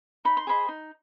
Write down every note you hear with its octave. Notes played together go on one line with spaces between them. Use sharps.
D#4 B5
C6
G#4 C5 D#5 B5
D#4